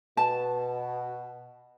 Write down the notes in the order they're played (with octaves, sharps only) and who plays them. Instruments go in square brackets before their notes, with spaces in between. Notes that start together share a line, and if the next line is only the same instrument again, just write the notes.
[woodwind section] B2 [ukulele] A5